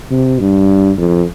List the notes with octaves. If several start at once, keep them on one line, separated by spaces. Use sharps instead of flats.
C3
G2
F2